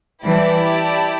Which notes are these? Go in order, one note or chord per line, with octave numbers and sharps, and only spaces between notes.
E3 G3 E4 G4 D5 A5